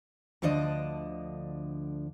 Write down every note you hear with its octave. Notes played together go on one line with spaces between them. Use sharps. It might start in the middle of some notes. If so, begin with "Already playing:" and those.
D2 D3 F3 D4 D#5